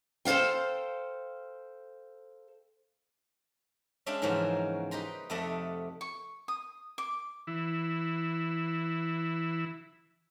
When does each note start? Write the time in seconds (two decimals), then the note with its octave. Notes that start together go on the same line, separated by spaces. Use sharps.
0.25 A4 C5 D5 F5 G5
4.06 G#3 C#4 D4 E5 F5 G5
4.22 G#2 C#3 E3 F3 A#3 F#4
4.91 D#4 G4 B4 G5 A#5 C6
5.30 F2 C3 A3 D5 D#5 F#5
6.01 C#6
6.48 D#6
6.98 D6
7.47 E3 E4